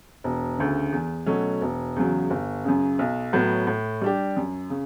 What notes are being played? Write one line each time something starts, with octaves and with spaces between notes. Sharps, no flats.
E1
D2 C#3
E2
B2 F#3 A3 C#4
E1
E2 C#3 F#3
G1
F#2 C#3
B1
A2 F#3 B3
A2
G3 D4 G4
F#2
C#3